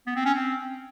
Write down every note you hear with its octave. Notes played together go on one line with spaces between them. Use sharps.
B3
C4
C#4
C4